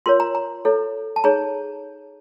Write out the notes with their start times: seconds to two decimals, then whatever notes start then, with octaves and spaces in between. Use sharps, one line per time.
0.06 F4 A#4 C#5 C6
0.20 A#5
0.35 A#5
0.65 E4 A4 C#5
1.16 A5
1.24 D#4 G#4 C#5 A#5